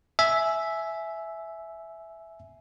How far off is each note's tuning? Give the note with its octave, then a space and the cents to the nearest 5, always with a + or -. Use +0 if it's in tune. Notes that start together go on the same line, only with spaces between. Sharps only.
E5 +0 G#5 +20